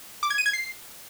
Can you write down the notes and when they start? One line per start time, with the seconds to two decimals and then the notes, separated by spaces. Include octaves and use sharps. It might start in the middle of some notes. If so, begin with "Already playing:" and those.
0.23 D6
0.30 G#6
0.38 D#7
0.46 G#6
0.53 C7